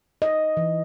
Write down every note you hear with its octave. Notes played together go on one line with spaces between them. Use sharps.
D#5
E3